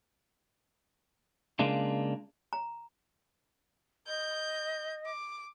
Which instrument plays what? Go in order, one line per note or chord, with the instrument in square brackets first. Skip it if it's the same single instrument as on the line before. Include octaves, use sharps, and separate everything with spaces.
[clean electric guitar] C#3 G#3 A#3 D4 F4
[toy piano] A#5
[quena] D#5 [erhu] G6
[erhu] D6